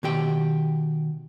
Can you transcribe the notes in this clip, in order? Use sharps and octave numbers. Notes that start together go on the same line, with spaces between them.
B2 D#3 G4 G5